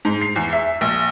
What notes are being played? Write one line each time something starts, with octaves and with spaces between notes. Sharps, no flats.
G#2
C7
E2
E5
A#1